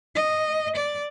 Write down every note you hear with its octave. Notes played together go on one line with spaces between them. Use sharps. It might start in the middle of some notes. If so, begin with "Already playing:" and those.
D#5
D5